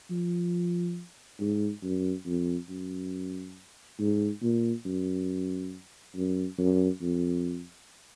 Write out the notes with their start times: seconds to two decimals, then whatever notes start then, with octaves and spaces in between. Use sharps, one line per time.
0.10 F3
1.40 G#2
1.83 F#2
2.26 F2
2.69 F#2
3.99 G#2
4.42 A#2
4.85 F#2
6.15 F#2
6.58 F#2
7.02 F2